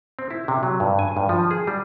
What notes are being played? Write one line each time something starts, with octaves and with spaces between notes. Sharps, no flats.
C4
E4
C3
F#3
G2
G#5
G2
F3
G#4
G3